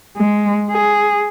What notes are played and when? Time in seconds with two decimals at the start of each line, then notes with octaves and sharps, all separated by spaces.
0.17 G#3
0.71 G#4